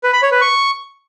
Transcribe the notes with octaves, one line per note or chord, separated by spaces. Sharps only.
B4
B5
C#5
B4
C#6